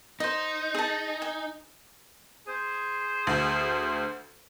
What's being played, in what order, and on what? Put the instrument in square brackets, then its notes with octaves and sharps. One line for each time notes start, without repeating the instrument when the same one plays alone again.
[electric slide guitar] D#4 [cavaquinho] C5 D#5
[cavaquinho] G#4 A5
G#5
[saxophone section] G#4 C5
[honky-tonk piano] D2